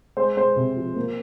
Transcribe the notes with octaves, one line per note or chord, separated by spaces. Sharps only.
G#3 C5
G#3 C5
C3
F3
A#3